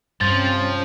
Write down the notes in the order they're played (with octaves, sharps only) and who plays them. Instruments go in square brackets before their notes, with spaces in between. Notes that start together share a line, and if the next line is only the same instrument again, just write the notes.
[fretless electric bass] G2 [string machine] C3 C4 C#4 [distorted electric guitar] F3 [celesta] A6